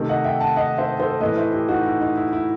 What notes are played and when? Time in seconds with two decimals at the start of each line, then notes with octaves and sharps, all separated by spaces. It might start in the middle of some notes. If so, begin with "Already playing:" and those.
Already playing: C3 D#3 A3
0.09 D#5 F#5
0.24 E5 G5
0.40 F#5 A5
0.56 D#5 F#5
0.78 C5 E5
0.99 A4 C5
1.21 A2 E3 A3 B4 D#5
1.37 C5 E5
1.53 E4 G4
1.69 D#4 F#4
1.85 E4
2.01 D#4
2.17 E4
2.33 E4